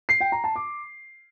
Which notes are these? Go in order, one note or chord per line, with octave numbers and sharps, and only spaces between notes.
C7
G5
A#5
A5
D6